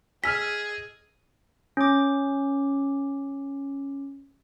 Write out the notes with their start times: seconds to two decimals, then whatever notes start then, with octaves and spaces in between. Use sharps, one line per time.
0.24 G#4 D#5 G#5 E6 F6 B6
1.77 C#4 D6